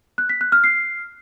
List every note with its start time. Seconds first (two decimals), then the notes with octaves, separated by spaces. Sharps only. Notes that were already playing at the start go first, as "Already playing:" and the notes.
0.18 F#6
0.29 B6
0.41 F#6
0.52 F6
0.64 C7